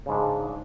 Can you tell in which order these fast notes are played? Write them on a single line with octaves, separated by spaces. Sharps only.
C#3 G#2 D4